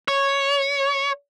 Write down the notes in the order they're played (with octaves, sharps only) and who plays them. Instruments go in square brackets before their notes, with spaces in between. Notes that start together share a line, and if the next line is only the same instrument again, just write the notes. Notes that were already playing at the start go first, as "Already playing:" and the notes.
[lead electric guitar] C#5